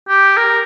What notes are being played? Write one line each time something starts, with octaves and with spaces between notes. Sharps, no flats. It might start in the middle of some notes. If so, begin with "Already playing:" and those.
G4
A#4